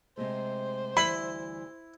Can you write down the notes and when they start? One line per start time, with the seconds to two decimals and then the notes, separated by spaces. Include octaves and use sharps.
0.17 C3 G#3 A3 C5
0.97 D2 E3 G3 E4 B5